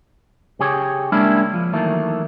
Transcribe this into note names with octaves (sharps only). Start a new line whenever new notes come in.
C#3 C#4 G4 G#4 C#5
G3 G#3 A#3 C#4 D4 E4
F3
D#3 E3 F#3 A3 A#3